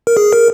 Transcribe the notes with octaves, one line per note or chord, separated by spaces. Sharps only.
A#4
G#4
A#4